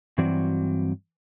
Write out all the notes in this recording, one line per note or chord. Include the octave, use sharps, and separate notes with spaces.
G2 E3 F#3 C4 F#4 D5